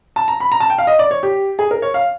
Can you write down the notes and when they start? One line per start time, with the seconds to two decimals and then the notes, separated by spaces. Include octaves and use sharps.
0.16 A5
0.28 A#5
0.40 B5
0.52 A#5
0.60 A5
0.70 G5
0.78 F5
0.87 D#5
0.99 D5
1.11 C#5
1.23 G4
1.59 G#4
1.71 A#4
1.82 C#5
1.94 F5